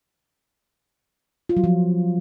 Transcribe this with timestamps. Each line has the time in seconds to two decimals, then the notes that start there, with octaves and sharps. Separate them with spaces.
1.49 F4
1.57 F#3
1.64 F3